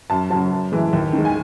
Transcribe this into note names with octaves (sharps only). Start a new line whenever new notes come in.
F#2 A5
C#3 F#3 A5
F#2
E3 G#3
D#2
D#3 G#3
G#5